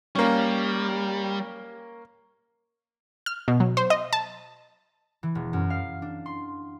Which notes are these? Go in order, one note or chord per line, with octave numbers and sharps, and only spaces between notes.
G3 A#3 C#4
F6
B2
F#3
C5
D#5
A5
E3
E1
F#2
F5
D4
C6